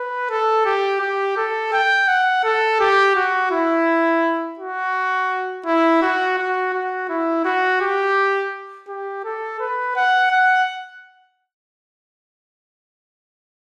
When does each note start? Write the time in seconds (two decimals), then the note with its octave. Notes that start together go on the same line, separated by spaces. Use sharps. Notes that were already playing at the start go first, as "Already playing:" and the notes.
Already playing: B4
0.30 A4
0.65 G4
1.01 G4
1.37 A4
1.73 G5
2.08 F#5
2.44 A4
2.80 G4
3.16 F#4
3.51 E4
4.59 F#4
5.66 E4
6.02 F#4
6.38 F#4
6.73 F#4
7.09 E4
7.45 F#4
7.81 G4
8.88 G4
9.24 A4
9.60 B4
9.96 F#5
10.31 F#5